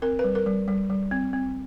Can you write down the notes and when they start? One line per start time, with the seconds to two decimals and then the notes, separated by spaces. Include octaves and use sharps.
0.02 C4 A#4
0.19 B4
0.24 G3
0.35 A#4
0.46 G3
0.68 G3
0.90 G3
1.11 C4
1.33 C4